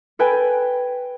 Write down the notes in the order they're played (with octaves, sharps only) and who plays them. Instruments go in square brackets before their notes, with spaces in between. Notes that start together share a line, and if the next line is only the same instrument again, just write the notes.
[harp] A4 B4 G5 G#5